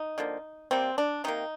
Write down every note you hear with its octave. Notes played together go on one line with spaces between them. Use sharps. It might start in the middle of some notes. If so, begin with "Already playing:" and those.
Already playing: D#4
D3 F3 A#3
C3 G3 A#3 C4
D4
C3 D#3 A#3 D#4